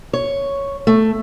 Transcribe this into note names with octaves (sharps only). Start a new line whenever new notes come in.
C#5
A3